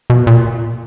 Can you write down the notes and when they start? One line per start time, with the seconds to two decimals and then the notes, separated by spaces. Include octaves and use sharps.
0.10 B2
0.27 A#2